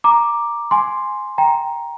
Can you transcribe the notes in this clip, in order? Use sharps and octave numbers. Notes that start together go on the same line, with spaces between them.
A#5 D6
G#5 C6
G5 A#5